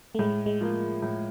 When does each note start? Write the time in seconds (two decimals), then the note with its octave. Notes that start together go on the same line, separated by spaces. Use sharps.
0.15 A3
0.19 A2 G#3
0.46 G#3
0.61 F3 A#3
1.02 A2